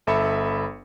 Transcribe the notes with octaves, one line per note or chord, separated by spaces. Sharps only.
G1 A4 E5 B5 C#7